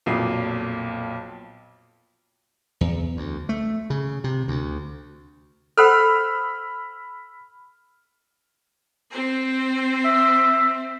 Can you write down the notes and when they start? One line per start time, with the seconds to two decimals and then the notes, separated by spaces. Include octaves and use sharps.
0.06 B1 F2 A#2 D#6 C7
2.81 E2
3.17 D2
3.49 A3
3.90 C#3
4.24 C3
4.48 D2
5.78 A4 C5 F#5 B5 E6 F6
9.11 C4 C5
10.05 E5